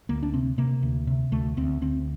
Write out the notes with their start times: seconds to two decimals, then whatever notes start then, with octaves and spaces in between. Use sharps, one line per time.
0.09 D2 A#3
0.23 D4
0.33 C3 C4
0.58 C3 A#3
0.83 D2
1.07 C3
1.32 D2 A3
1.57 D2 C4
1.82 D2 C4